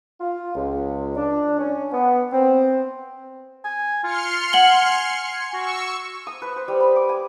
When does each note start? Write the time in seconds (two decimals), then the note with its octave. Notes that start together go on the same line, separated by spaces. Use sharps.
0.21 F4
0.55 C#2
1.17 D4
1.59 C#4
1.92 B3
2.32 C4
3.64 G#5
4.04 F4 C6 F6 C#7
4.53 F#5 G#5 F#7 G7
5.53 F#4 C#6 E6
6.27 D#6
6.42 B4
6.56 C5
6.68 G3
6.80 B5
6.96 D6
7.09 G#5